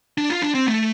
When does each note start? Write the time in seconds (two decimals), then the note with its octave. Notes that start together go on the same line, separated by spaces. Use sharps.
0.18 D4
0.30 F4
0.42 D4
0.55 C4
0.67 A3